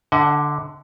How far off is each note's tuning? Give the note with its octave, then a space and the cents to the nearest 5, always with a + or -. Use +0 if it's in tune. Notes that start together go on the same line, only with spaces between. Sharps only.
D3 +0 D#5 +45 F#5 +25